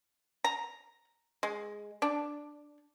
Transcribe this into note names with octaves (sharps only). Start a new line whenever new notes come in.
A#5
G#3
D4